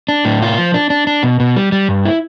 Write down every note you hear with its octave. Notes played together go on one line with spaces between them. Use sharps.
D4
A2
F4
F3
D4
D4
D4
B2
B2
G3
G3
G2
E4